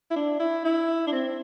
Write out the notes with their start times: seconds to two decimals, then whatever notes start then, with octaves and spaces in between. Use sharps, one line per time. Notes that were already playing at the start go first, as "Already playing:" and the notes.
0.11 E4
0.16 D4
0.40 E4
0.65 E4
1.07 D4
1.12 C4